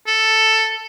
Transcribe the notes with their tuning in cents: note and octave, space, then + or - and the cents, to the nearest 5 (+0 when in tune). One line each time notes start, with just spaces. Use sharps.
A4 +5